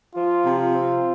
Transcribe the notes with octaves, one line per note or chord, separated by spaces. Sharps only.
F3 F4
C3
F4
C4